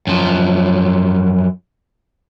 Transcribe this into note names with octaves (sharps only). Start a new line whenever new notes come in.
F#2 F3